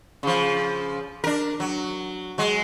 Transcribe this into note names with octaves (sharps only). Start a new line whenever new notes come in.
C#3 F3
D4 A#4
F#3
F#3 G#3